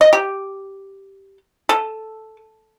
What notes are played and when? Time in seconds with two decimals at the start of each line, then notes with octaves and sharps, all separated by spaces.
0.01 D#5
0.13 G4
1.69 A4